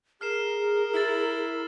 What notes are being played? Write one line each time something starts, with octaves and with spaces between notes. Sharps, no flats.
G#4 A#4 F6 C7 E7
E4 E6 A6